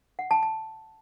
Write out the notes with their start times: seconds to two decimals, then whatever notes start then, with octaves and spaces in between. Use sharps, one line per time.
0.19 F#5
0.31 A5
0.43 A5